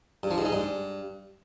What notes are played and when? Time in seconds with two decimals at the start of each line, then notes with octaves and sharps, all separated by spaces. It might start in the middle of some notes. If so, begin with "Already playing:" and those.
0.23 G2
0.31 F3
0.38 G#2
0.45 G#3
0.53 G2